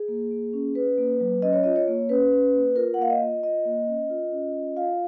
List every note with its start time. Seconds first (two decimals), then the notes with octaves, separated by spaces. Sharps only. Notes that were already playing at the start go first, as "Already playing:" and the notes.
Already playing: G#4
0.08 A#3
0.31 A#3
0.53 C#4
0.75 C#4 B4
0.98 A#3
1.20 F#3
1.42 C#4 D#5
1.53 C#5
1.64 F4 D#5
1.76 C#5
1.88 A#3
2.09 C#4 B4
2.32 C#4
2.54 A#3
2.76 F4 A#4
2.94 F#5
2.99 A#3 F5
3.10 D#5
3.21 F4
3.43 F4 D#5
3.65 A#3
3.88 C#4
4.10 F4
4.32 C#4
4.54 F4
4.76 F4 F5